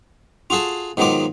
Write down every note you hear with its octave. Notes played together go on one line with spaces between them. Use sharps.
F4 F#4 G#4 A4 A5
G#2 D#3 F#3 B3 F4 D6